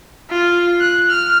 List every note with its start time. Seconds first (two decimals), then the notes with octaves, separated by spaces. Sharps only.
0.30 F4
0.80 F#6
1.09 F6